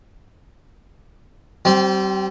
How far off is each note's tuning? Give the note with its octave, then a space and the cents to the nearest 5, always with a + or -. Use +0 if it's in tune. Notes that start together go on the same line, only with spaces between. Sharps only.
G3 -35 C4 +0